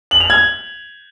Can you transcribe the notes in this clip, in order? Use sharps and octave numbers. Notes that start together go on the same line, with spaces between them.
F#7
F7
G#6